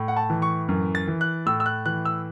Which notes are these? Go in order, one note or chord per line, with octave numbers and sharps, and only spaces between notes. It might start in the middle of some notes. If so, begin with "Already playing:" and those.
Already playing: A2
F#5
A5
E3
C#6
F#2
A6
E3
F#6
A2 E6
E6
F#6
E3 F#6
E6